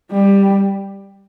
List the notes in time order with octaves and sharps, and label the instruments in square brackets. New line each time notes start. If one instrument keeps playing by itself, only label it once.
[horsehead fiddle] G3